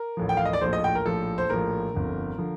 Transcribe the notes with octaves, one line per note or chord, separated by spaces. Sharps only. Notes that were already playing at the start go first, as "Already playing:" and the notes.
Already playing: A#4
A1 A2 F3
G5
F5
D#5
D5
A#1 A2 F3 C5
D#5
G5
A#4
A#1 A2 F3 A4
C5
A#1 A2 F3 A#4
G1 F2 D3
D3 F3